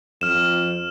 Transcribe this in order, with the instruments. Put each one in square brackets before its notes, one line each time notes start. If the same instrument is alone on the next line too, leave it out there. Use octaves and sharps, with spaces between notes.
[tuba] F2 [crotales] F6 E7